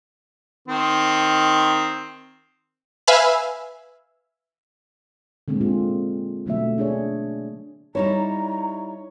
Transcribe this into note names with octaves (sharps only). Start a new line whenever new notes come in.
D#3 C4
B4 E5 F5 G#5 B5 F6
D3 G#3 A#3 C4
A#2 C4 F4 G#4
B2 D3 F#3 A3 A#3 E5
D4 G#4 C#5
G3 D#4 E4 C#5 A#5